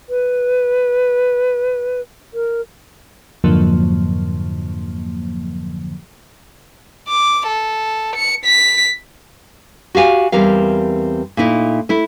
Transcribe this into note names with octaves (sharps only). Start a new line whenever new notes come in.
B4
A#4
F2 G#2 D3 F3 F#3 A#3
D6
A4
C#7
B6
F#4 G4 F5 G#5
E2 G3 C4 A#4 F5
A#2 A3 D#4 E4
A3 E4